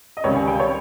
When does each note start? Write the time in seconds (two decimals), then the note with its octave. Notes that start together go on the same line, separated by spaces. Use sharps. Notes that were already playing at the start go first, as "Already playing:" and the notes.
0.17 D#5
0.24 C#2 C3 D#3 G3 C#5
0.36 G#5
0.47 G5
0.60 C#5